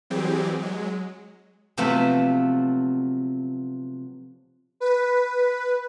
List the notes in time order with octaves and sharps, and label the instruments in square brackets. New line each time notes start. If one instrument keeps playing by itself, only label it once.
[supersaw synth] E3 F#3 G3 C4 G4 G#4
F#3 G#3
[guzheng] C3 F3 F#3 A3 B3 C4
[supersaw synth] B4